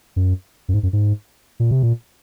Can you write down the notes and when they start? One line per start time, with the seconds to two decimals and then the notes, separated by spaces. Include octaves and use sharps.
0.16 F#2
0.69 F#2
0.74 G#2
0.83 F#2
0.93 G#2
1.60 A#2
1.71 C3
1.83 A#2